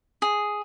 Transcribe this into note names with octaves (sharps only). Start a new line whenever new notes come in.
G#4